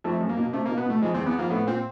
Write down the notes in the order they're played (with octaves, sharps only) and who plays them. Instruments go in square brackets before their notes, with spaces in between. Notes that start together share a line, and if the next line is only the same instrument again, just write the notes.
[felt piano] F2 [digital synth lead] A3
[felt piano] F#2
[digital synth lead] A#3
[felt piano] B2
[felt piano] C3 [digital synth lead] A3
[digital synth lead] A#3
[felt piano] B2
[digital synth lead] B3
[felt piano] B2
[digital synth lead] A3
[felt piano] F2 [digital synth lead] G#3
[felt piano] E2 [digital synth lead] C4
[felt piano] E2 [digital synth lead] B3
[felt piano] F2 [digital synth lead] A#3
[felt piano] A2 [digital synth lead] B3
[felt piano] A#2 [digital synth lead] C4